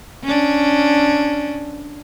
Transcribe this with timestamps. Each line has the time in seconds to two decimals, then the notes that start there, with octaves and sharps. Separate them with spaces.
0.24 C#4 D4